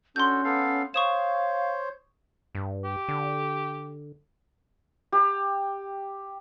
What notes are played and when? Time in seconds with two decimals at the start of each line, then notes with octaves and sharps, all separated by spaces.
0.16 C#4 D4 F#4 A4 C6 G6
0.44 B3 A4 F5
0.94 C5 C#5 F5 C#6 D#6 E7
2.55 G2
2.84 G4
3.08 D3
5.12 G4